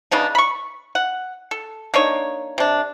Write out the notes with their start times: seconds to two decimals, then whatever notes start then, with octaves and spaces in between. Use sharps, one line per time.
0.11 C#3 B3 D4 D#4
0.35 B5 C#6
0.95 F#5
1.51 A4
1.94 A#3 D4 D#4 C#5
2.58 C3 D4